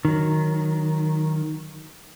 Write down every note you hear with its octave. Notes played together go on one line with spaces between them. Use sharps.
D#3 F#3